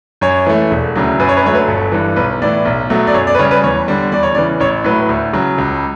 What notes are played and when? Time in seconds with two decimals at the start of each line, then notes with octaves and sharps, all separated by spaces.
0.21 F#2 C#5
0.47 E3 A3
0.71 E1
0.96 D2 C#3 F#3
1.19 F#2 B4
1.29 C#5
1.37 B4
1.43 D3 F#3 A3 C#5
1.55 B4
1.68 G1 A4
1.92 G2 E3
2.16 B1 B4
2.42 A2 E3 D5
2.65 B1
2.90 B2 F#3 A3
3.07 D5
3.14 F#2 C#5
3.27 D5
3.35 B4
3.39 C#3 G3 C#5
3.51 B4
3.64 E2 C#5
3.88 D3 G3
4.12 E2 D5
4.23 C#5
4.35 C#3 E3 D5
4.60 A1 C#5
4.84 A2 F#3 B4
5.09 D2
5.33 C#3 F#3
5.58 C#2